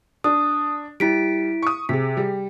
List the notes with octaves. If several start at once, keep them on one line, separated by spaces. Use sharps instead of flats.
D4 D#6
G3 E4 B6 D7
C#6 D#6
C3 G#4 B6
G3